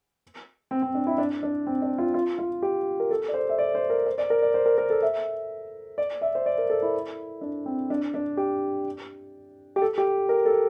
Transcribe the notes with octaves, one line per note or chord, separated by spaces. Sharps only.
C4
C4
D4
E4
D4
D4
C4
D4
F4
F4
F4
G4
A#4
A4
D5
C5
E5
D5
C5
A#4
C5
D5
A#4
D5
C5
A#4
A#4
A4
E5
D5
E5
C5
D5
A#4
A4
E4
D4
C4
D4
D4
G4
G4
A4
G4
A#4
A4